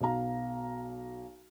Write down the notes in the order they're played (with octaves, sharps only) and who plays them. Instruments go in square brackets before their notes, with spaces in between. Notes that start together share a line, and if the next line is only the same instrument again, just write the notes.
[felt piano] B1 F#3 B3 F5 A#5